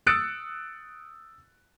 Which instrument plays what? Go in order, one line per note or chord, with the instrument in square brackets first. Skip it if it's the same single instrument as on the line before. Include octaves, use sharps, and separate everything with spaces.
[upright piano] D#6 E6 F#6 A6 C#7 D7